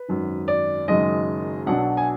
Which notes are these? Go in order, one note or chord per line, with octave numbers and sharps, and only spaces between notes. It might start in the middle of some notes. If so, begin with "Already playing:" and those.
Already playing: B4
G#1 F#2 D#3
D5
F#1 F#2 D#3 G#3 D#5
B1 B2 F#3 D4 F#5
G#5